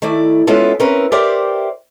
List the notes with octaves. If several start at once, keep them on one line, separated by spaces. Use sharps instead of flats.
D#3 A3 E4 D5
G#3 B3 C#4 E4 F4 A4
C4 C#4 E4 A#4 B4
G4 A#4 C5 D5 E5 G5